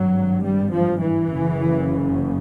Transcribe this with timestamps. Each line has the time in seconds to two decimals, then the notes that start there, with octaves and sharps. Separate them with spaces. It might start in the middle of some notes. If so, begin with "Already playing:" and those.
Already playing: G#1 G2 F#3
0.44 G3
0.73 F3
1.01 E3
1.29 F#1 F#2 C#3